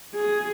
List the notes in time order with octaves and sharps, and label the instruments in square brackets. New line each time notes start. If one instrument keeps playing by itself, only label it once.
[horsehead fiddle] G#4